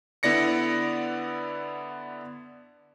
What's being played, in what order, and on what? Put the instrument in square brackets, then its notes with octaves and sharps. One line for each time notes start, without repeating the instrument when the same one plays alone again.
[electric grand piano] D3 B3 E4 D5 A#6 C#7